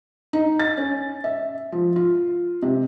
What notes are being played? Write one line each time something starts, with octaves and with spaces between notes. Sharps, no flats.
D#4
A6
C#4
E5
F3
F4
C3